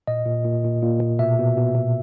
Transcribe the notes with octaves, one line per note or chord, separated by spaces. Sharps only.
A#2 D#5
A#2
A#2
A#2
A#2
A#2
B2 E5
B2
B2
B2